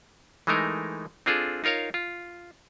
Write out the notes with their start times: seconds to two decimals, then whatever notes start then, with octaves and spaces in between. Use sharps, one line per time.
0.47 E3 G#3 A3 D#4 A#4
1.26 C4 D4 F4 G#4 A4
1.64 D#4 F4 A#4 C#5 F5
1.94 F4